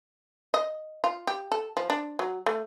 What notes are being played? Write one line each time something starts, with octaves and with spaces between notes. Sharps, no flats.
D#5
F4
G4
A4
F3
D4
F#3
A3